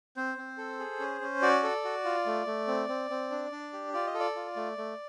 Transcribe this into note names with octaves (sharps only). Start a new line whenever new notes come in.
C4 C5
C4
A4
G#4
C#4
C#4
F#4 D5
A4
F#4
F4
A3
A3
C4
C4
C4
D4
D4
G4
F4 D5
D#5
A4
D5
F4
A3
A3